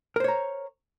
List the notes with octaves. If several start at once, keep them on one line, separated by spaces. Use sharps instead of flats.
A#4 C5 C#5 A#5